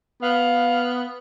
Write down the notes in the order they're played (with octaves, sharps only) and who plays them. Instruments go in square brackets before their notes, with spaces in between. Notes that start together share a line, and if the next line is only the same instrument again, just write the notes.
[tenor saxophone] B3 [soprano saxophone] F5